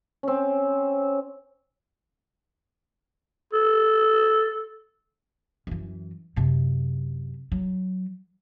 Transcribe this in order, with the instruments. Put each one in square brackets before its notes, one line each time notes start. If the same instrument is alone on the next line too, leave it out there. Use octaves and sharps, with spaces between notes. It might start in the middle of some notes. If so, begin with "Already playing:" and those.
[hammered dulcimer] C4 C#4
[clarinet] A4
[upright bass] F#2 E3
F#2 C3
F#3